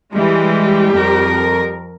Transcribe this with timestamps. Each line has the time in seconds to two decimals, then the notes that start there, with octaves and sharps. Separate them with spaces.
0.13 E3 G3 G#3 G4
0.91 F2 A#4